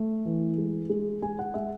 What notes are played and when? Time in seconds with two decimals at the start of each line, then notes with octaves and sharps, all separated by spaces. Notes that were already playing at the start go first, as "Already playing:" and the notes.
Already playing: A3
0.25 E3
0.58 G#3
0.89 G#3
1.22 G#3 G#5
1.39 F#5
1.54 G#3 E5